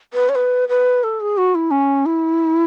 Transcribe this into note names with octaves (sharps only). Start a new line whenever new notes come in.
B4
C#5
B4
B4
A4
G#4
F#4
E4
C#4
E4